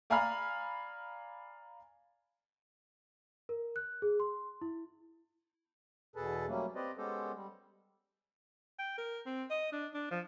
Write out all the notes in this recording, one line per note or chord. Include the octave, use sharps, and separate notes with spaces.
D5 F5 G#5 A#5 B5 F6
A#4
F#6
G#4
C6
E4
E2 B2 G#4 A4 B4 A5
F#3 G3 A3 A#3 C#4
C4 G4 B4 C5 D5 D#5
G#3 B3 C#4 G4 A4 C5
G3
G5
A#4
C4
D#5
D4
D4
F3